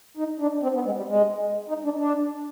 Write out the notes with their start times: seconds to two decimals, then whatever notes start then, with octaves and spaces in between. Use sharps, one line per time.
0.17 D#4
0.40 D4
0.63 C4
0.75 B3
0.86 G#3
0.97 G3
1.08 G#3
1.69 D#4
1.84 D4
1.99 D4